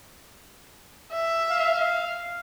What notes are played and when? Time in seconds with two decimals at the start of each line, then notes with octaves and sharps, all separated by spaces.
1.11 E5
1.51 F5